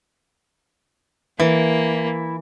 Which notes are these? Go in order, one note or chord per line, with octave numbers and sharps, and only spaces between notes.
E3 A#3 E4